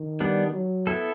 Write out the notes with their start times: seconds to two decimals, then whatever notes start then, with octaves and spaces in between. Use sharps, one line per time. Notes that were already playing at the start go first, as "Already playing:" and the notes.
Already playing: D#3
0.20 G3 B3 D4
0.53 F#3
0.87 B3 E4 A4